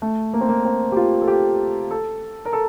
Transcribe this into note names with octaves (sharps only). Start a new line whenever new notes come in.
A3
A#3
C4
A#3
C4
G4
F4
A4
G4
A4
A#4
A4